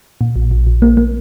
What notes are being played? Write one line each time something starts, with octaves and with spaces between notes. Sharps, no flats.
A#2
A#1
A#1
A#1
A#3
A#3